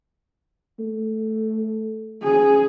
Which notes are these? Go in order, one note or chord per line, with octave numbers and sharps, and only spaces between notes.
A3
C#3 G#4